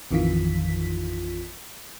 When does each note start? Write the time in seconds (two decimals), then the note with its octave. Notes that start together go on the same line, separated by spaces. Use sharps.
0.11 A1 F2 D#3 E3 F4 B6